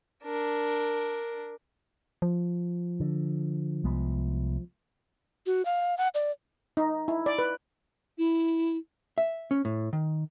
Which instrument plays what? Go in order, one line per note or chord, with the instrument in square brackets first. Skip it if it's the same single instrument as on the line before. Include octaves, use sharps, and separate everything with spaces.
[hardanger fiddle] D4 A#4
[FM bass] F3
[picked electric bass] D3
C2 G#3 B3
[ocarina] F#4
F5
F#5
D5
[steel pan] D#4
E4
D5
B4
[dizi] E4
[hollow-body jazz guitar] E5
C#4
A2
D#3